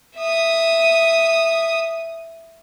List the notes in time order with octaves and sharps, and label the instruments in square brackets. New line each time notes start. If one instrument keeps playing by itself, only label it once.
[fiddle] E5 D#6